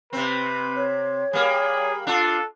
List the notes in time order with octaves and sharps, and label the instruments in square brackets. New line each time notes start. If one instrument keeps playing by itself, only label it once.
[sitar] C3 C4 [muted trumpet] B4
[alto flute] C#5
[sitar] G3 A#3 [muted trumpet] G#4
[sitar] D4 F4 [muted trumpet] A4